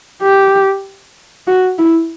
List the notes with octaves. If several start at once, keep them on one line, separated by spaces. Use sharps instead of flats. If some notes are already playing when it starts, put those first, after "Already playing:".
G4
F#4
E4